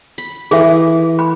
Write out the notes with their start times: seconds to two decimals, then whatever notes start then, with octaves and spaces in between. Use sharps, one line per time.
0.18 B5
0.51 E3 G#4 A4 E5
1.19 B5